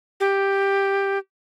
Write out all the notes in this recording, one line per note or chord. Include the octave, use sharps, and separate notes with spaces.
G4